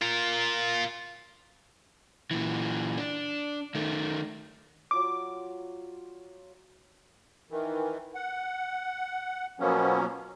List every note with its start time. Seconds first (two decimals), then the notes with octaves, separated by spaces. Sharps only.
0.01 F4 A#4
2.31 A#2 E3
2.98 D4
3.75 D#3 A3
4.91 F#3 F4 D5 D6
7.51 D#3 E3
8.15 F#5
9.60 B2 F3 F#3 A#3 B3 C#4